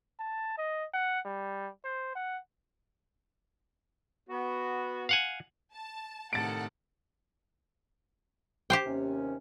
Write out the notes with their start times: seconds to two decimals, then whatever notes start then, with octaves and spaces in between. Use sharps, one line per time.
0.20 A5
0.58 D#5
0.94 F#5
1.25 G3
1.84 C5
2.15 F#5
4.29 B3 F#4
5.09 F5 F#5 G#5
5.73 A5
6.33 A2 C3 D#3 A4 F#5 A6 D7
8.70 G4 C5 G5
8.85 D#2 C3 C#4